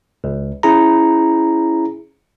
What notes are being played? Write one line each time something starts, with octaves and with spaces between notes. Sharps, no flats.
C#2
C#4 E4 G#4 A#5